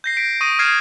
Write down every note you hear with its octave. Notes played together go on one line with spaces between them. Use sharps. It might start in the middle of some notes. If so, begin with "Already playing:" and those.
G6 A#6 C7
B6 C7 D7
C#6 D#6 A#6 D#7
D#6 F6 G6 G#6 C7 E7